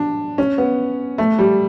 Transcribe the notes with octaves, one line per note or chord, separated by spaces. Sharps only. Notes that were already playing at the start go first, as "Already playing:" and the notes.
Already playing: D4
C#4
B3
A3
G3